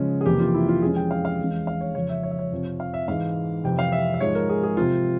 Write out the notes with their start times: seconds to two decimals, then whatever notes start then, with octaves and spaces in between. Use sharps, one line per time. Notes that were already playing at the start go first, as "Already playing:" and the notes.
Already playing: C#3 F3 G#3 C#4
0.21 G#4
0.26 F2 C3 E3 A#3 G4
0.40 F4
0.54 E4
0.69 F4
0.82 F2 E3 G#3 C#4 G#4
0.96 G5
1.11 F5
1.25 F5
1.39 E2 E3 G#3 C#4
1.67 F5
1.81 C#5
1.95 F2 C#3 F3 C#5
2.09 E5
2.23 C#5
2.31 E5
2.39 C#5
2.51 F2 C3 F3 C4
2.80 F5
2.94 E5
3.08 G#2 E3 G#3 F5
3.64 F2 C3 E3 G5
3.79 F5
3.92 E5
4.14 E5
4.21 G#2 F3 G#3 C#5
4.35 A#4
4.49 G#4
4.63 G#4
4.77 C3 F3 C4 F4